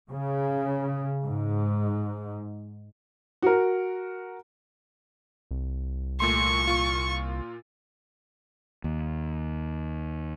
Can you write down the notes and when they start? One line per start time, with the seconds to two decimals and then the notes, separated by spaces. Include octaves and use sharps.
0.10 C#3
1.24 G#2
3.42 F#4 A#4
5.51 C2
6.20 A#2 A3 C6 C#6
6.67 A#2 F4
8.84 D#2